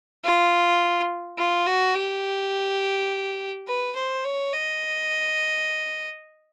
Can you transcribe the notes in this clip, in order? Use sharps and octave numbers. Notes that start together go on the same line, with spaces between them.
F4
F4
F#4
G4
B4
C5
C#5
D#5